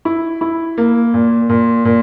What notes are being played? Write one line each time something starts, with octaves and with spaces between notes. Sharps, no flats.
E4
E4
A#3
A#2
A#2
A#2